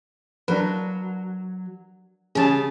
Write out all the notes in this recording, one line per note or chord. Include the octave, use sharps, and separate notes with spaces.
F#3 D4 A#4 B4
C#3 G3 G#4 A5